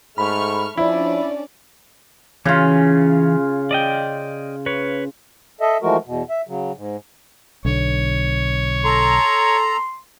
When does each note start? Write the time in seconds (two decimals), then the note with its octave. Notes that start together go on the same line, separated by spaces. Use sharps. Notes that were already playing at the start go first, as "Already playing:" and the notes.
0.18 G#2 A3 B5 C#6 F6
0.77 F3 C#4 D4 E4 D5
2.45 C#3 E3 C#4 F4
3.71 D5 D#5 G5
4.66 B4 C#5
5.61 A4 D#5 E5
5.82 E3 F3 G#3 A3 F#4 A#4
6.06 E2 B2
6.30 E5
6.47 C#3 F#3
6.76 G#2
7.65 B1 D3 C#5
8.85 A4 A#5 C6